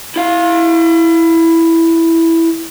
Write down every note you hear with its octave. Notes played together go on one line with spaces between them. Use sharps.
E4 F5